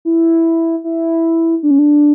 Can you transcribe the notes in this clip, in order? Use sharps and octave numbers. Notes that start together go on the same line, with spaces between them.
E4
E4
D4
C#4
D4